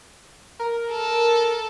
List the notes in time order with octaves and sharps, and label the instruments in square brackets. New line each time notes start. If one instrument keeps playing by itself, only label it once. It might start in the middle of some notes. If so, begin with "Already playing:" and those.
[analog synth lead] A#4
[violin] A4